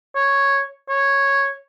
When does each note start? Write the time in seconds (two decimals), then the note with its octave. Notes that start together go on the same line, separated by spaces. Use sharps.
0.15 C#5
0.89 C#5